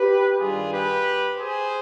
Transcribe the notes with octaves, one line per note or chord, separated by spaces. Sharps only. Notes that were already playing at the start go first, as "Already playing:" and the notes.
Already playing: G4 B4
G2 D#3 G3 F4 G#4
G4 B4
G#4 C5